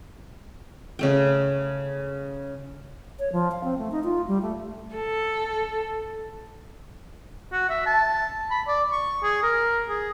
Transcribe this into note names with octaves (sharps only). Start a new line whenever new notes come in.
C#3 A3 G5
C#5
F3
F5
C4
A3
D#4
F4
G3
A3
A4
F#4
E5
A5
B5
D5
C#6
G#4
A#4
G#4